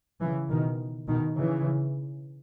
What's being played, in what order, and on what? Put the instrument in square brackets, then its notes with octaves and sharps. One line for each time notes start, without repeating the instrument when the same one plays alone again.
[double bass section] C#3 E3
B2 D#3
B2 D#3
C#3 E3